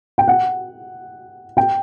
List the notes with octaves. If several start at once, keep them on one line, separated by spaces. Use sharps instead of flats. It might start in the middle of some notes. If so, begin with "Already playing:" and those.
G5
F#5
G5